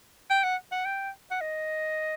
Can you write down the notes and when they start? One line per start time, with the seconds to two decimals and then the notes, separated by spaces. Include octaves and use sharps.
0.30 G5
0.43 F#5
0.72 F#5
0.85 G5
1.31 F#5
1.41 D#5